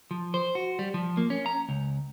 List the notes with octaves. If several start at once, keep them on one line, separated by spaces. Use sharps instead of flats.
F3
C5
F#4
G3
F3
A#3
C#4
A#5
C#2